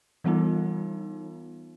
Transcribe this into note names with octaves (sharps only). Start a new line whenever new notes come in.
E3 G3 B3 D#4 F4